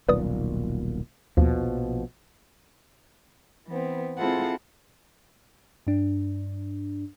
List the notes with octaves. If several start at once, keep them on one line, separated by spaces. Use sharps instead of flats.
D#1 B1 A#2 B4 D5 D#6
A#1 D#2 B2 F3
E3 B3 C4
C4 E4 F4 G#4 A4 F#5
G2 D4